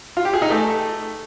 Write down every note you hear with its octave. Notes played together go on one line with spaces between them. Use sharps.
F4
G4
G#4
D#4
A3